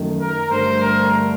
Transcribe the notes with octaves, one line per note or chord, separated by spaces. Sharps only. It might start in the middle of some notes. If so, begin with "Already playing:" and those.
Already playing: F#2 D#3 A3
A#4
G2 D3 A3 C5
A#4